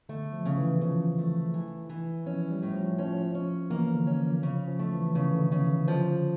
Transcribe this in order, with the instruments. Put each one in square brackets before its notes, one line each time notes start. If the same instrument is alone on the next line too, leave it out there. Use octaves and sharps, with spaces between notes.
[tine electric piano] D3 [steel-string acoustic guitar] A3
[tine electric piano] F3
[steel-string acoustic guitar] C#3
[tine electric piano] E3
[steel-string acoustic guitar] C#3 [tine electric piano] F3
[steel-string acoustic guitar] A3
E3
E3
[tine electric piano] F3 [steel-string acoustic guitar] C#4
[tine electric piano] G3
[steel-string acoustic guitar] A2
[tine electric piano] F3
[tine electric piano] F3 [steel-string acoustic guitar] C#4
[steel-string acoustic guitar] C#4
[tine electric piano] E3 [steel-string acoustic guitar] A#3
[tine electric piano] D3
[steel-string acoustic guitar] C#4
[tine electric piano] F3
[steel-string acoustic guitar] C#3 [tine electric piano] F3
[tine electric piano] F3
[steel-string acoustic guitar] A3
[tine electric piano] E3
[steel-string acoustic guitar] C#3 [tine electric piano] E3
[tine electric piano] D3
[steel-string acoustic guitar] C#3
[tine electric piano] E3
[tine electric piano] D3 [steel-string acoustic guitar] F3